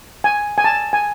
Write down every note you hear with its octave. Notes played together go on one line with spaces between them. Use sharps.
G#5
G#5
A5
G#5